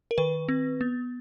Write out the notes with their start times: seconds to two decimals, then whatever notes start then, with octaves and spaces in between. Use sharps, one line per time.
0.11 A#4
0.18 D#3 B4
0.49 C4
0.81 B3